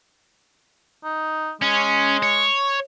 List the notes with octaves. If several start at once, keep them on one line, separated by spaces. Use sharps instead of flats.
D#4
G#3 C#4
C#5